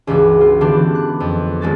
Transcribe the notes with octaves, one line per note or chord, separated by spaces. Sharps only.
C#2 G2 E3 F#4 E6
F4
D3 E3 B3 D4 G4
F#6
F2
D#1 G#3 F#4 A6